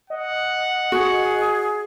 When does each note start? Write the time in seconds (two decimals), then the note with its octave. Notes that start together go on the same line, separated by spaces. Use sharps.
0.10 D#5 F#5
0.92 F#4 G#4